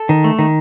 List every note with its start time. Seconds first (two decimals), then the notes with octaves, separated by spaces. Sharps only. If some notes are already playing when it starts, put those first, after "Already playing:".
Already playing: A4
0.09 D#3
0.24 A3
0.39 D#3